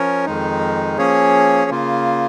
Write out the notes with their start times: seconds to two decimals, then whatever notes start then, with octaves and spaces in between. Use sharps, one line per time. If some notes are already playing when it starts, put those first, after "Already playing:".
Already playing: F3 C#4 A#4 C#5
0.26 F2 D#3 G#3 D#4
0.98 F3 A#3 C#4 G#4 C#5
1.71 C#3 A#3 F4